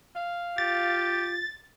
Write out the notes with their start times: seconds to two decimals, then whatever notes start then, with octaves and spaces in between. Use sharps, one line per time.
0.15 F5
0.58 F4 G4 A6